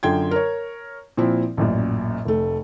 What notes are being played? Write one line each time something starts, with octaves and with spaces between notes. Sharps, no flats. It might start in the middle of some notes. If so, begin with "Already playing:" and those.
F#2 D3 F4 G5 C6 G#6
A#4 C#5
A#2 F3 C4 E4
A1 F#2 A#2
F1 A3